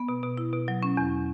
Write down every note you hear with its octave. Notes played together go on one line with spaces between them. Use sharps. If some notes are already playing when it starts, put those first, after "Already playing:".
Already playing: B3
B2
B2
E4
B2
F#3
C#4
E2